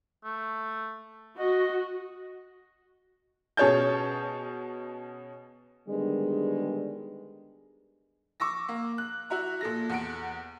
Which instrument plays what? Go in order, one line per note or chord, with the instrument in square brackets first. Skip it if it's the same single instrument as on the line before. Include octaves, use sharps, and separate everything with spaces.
[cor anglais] A3
[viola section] F#4 [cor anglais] D#5
[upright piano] B2 C#4 G#4 C#5 A5 G6
[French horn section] D3 D#3 G3 G#3 B3 G#4
[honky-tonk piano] C#6 D6 E6 A#6
A#3
F#6
E4 F#4 E5 A#5
A#2 A4 A#6
E2 F#5 D7